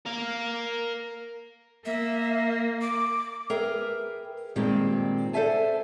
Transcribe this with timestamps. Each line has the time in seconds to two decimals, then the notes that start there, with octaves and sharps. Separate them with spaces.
0.05 A#4 F5
1.85 A#3 E5
2.81 D6
3.50 G#4 A#4 B4 E5 G5
4.56 G2 A#2 D#3 G#3 C4 G4
5.33 A4 C5 D5 E5 G#5 A5